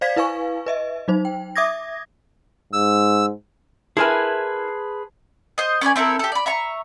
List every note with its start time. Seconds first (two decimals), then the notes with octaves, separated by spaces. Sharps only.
0.01 C5 D5 F5 G#6 B6
0.17 E4 B4 F5 G#5 C#6
0.66 B4 D#5 E5
1.08 F#3 D#4 C5
1.25 G5
1.56 E5 D6 D#6 G#6 A#6
2.73 G#2 E6
3.97 E4 G#4 A#4 B4 G#5 A5 C6 G#6
5.58 C5 D#5
5.81 C#4 B4 D5 G#5
5.96 C4 E4 A4 A#4
6.19 G4 A4
6.32 D5 B5
6.46 E5 A#5 C#6